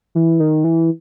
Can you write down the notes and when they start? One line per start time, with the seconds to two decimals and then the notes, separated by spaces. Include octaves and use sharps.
0.15 E3
0.40 D#3
0.64 E3